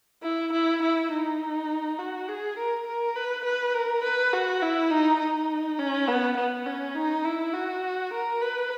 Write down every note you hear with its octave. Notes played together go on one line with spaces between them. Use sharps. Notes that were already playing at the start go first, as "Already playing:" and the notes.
E4
E4
E4
D#4
F#4
G#4
A#4
A#4
B4
B4
A#4
B4
F#4
E4
D#4
D#4
C#4
B3
B3
C#4
D#4
E4
F#4
A#4
B4